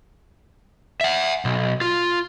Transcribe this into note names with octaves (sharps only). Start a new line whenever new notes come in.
E5 F#5
B1
F4